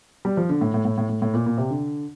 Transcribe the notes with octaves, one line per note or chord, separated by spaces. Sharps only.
G3
F3
D3
A2
A2
A2
A2
A2
A2
A#2
A#2
C3
D3